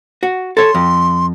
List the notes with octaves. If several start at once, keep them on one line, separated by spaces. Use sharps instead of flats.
F#4
A4 C#5 C6
F2